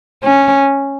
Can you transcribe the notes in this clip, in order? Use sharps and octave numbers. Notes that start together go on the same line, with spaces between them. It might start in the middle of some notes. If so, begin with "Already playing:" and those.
C#4